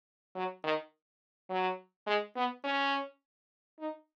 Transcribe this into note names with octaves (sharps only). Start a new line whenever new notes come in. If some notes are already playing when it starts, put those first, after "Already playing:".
F#3
D#3
F#3
G#3
B3
C#4
D#4